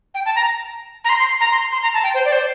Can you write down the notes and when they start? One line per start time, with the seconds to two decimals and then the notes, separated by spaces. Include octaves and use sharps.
0.15 G5
0.25 A5
0.36 A#5
1.05 A#5
1.09 C6
1.20 C6
1.41 A#5
1.51 C6
1.72 C6
1.83 A#5
1.94 A5
2.03 G5
2.14 C5
2.25 D5
2.32 C5